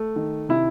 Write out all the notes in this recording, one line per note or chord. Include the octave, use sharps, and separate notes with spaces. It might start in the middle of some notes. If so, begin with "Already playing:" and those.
Already playing: A3
D#3
C3 E4